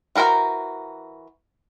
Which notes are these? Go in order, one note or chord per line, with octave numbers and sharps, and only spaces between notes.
E3 F#4 A#4 C5 A#5